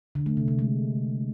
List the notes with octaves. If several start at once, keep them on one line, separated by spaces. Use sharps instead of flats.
D3
A3
C3
C3
G#3